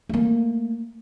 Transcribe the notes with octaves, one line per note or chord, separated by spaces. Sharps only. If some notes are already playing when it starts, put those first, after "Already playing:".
A3 A#3